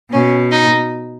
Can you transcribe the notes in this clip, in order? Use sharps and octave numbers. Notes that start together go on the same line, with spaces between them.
B2 C#4
D#4